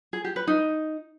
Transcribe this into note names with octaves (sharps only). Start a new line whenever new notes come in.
G#4
G4
B4
D#4